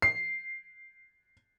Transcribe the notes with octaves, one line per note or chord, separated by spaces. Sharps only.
C7